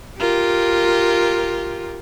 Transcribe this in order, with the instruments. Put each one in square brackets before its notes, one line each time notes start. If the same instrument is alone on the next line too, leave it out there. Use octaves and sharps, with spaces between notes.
[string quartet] F4 G4 A#4